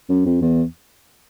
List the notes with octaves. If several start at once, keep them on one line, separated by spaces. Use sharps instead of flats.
F#2
F2
E2